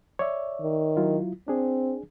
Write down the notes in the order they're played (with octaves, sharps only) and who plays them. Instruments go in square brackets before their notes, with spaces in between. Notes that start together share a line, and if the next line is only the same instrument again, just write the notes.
[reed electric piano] C#5 D5 E5
[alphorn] D#3
[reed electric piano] F#3 E4 F4
[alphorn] C4 [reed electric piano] D4 G#4